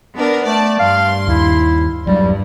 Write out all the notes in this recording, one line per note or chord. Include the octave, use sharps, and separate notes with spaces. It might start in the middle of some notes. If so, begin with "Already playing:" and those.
B3 D4 A#4
A3 D5 A5
G2 F5 C6
D#2 E4
E1 G2 F#3 G3